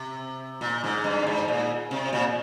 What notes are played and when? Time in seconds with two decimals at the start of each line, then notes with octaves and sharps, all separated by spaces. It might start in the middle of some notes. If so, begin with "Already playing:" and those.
Already playing: C3
0.61 A#2
0.84 G#2
1.04 G2
1.27 G#2
1.48 A#2
1.91 C3
2.13 A#2